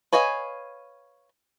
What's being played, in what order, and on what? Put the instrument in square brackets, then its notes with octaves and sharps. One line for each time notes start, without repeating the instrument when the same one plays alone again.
[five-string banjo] B4 C#5 D#5 F5 G#5